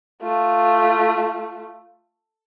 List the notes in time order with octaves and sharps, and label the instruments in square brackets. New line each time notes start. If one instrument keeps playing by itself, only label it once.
[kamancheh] A3 F4